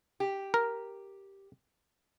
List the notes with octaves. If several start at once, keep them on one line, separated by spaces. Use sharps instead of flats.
G4
A#4